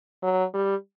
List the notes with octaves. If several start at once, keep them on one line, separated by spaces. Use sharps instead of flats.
F#3
G3